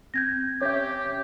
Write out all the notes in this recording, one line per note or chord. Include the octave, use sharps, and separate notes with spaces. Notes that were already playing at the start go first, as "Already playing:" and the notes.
C4 G6 G#6 A#6
C#4 G4 C#5 E5